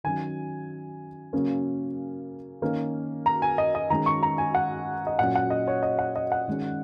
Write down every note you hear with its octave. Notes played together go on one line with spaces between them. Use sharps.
D#3 F#3 C#4 G#5
C#3 F#3 A#3 C#4
D#3 A#3 C#4
A#5
G#5
D#5
D#5
D#3 G#3 C#4 A#5
C#6
A#5
G#5
F#5
D#5
A#2 F#3 C#4 F#5
F#5
D#5
C#5
D#5
F#5
D#5
F#5
D#3 G#3 C#4